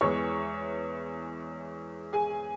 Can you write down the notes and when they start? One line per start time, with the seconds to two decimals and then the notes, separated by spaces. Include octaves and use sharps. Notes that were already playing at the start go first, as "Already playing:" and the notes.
0.01 E2 E3 G#3 C#5 C#6
2.13 G#4 G#5